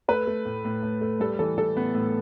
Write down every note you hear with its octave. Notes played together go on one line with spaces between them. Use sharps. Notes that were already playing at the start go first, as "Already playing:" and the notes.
A3 B4
A3
A2
A2
A2
A3
G3 A4
E3 A4
E3 A4
A2 B3
A2